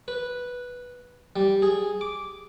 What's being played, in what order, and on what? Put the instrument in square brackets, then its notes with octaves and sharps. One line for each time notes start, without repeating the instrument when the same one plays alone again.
[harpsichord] B4
G3
G#4
D6